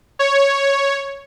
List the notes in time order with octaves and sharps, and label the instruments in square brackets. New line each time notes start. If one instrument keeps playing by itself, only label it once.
[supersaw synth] C#5